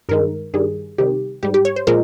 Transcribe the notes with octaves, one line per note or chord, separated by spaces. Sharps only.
G2 D#3 G#3 A#4
G2 D#3 G3 G#4
C3 D#3 G3 G4
G#2 G3 G4
G4
C#5
C5
A#2 F3 G#3 A#4